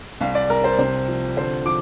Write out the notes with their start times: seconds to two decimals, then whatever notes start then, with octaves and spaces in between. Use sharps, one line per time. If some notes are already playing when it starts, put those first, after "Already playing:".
0.21 C2 F5
0.35 D5
0.50 C2 A#4
0.64 C5
0.78 C3 C5
1.08 F3
1.36 D3 C5
1.65 F3 D6